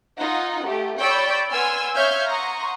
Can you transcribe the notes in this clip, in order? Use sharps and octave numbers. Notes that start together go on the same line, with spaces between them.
D#4 F4 F#5
A3 G4
C#5 D5 G5 B5 E6
B3 G#5 C6 E6 F6
C#5 E5 F5 F6 G6 G#6
F#5 A#5 C6 C#6 D#6